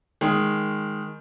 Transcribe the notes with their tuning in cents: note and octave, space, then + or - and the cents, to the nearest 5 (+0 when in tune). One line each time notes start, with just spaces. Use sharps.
D#3 +0 G#3 +0